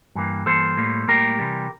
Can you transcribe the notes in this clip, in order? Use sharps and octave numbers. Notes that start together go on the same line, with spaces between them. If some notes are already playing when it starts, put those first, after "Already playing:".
G2 E3 A#3
G2 E3 A#3 A4 C5
A2 G3 A#3
A2 G3 A#3 G4 A#4
C3 E3 G3